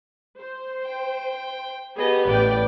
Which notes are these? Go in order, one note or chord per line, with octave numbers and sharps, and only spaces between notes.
C5
G5
B3 G4 G#4 D#5
A1 A2 B4 D5 G5